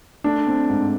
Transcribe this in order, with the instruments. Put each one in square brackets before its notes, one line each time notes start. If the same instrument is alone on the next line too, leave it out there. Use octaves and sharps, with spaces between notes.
[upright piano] A3 [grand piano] D4
[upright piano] C4
G#2